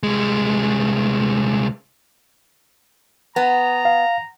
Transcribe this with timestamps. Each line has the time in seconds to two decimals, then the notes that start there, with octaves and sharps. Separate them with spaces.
0.03 C2 G#3
3.36 B3 A#5
3.85 F5